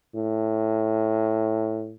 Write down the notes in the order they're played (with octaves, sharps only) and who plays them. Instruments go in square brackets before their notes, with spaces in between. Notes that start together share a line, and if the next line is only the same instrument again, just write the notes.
[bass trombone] A2